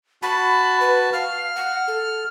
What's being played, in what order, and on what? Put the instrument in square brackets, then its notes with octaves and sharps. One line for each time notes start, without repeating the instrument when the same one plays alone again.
[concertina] F#4 A5 [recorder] B5
[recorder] B4
[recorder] F5 [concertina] F6
[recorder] F#5
A4